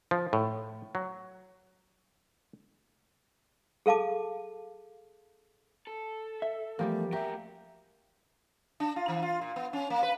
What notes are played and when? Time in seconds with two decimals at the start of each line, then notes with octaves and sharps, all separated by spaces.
0.11 F3
0.33 A2
0.95 F#3
3.86 G#4 A4 F5 A5 D6
5.87 A4
6.42 E5
6.79 E2 F3 G3 A3 A#3 G4
7.13 F#4 G4 A#4 E5
8.80 D4
8.96 F4
9.08 E3
9.23 F4
9.41 A#2
9.56 B3
9.73 C#4
9.90 A#3
10.03 B4